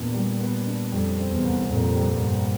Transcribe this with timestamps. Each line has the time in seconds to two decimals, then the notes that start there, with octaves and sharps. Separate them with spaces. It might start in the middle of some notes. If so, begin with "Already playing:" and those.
Already playing: E2 A#2 B3 D4
0.14 G3
0.40 B3
0.67 D4
0.92 F2 G3
1.18 C4
1.32 E2
1.44 C2
1.69 F2 A#2
1.95 G3
2.09 G2
2.22 C4